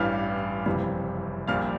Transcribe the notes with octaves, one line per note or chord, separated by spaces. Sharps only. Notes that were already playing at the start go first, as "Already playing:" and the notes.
Already playing: A1 G2 E3 G3 F5 F6
F#1 F2 C3 E3 G3
A#1 A#2 G3 F5 F6